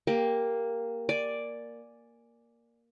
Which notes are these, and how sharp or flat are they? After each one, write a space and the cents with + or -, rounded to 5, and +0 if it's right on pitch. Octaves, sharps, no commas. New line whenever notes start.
A#3 +0 G4 +15
D5 +0 G#5 +0